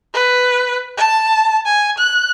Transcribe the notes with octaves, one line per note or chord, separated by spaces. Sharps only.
B4
A5
G#5
F#6